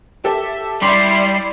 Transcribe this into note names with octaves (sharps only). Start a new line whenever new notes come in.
G4 A4 E5 A5
G3 E4 D5 G5 C6 D6 C7